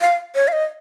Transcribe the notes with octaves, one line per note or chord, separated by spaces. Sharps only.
F5
C#5
F5
D#5